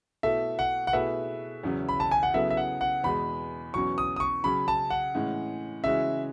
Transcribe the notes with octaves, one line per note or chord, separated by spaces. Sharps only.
B2 A3 E4 A4 E5
F#5
F#5
B2 A3 E4 G#4 B4 E5
E2 C#3 F#3 C#4
B5
A5
G#5
F#5
C#3 F#3 B3 E4 A4 E5
E5
F#5
F#5
E2 B2 G#3 B5
E2 B2 F#3 C#4 C#6
D#6
D#6
C#6
C#3 F#3 C#4 B5
A5
F#5
A2 E3 G#3 C#4
C#3 E3 G#3 C#4 F#4 E5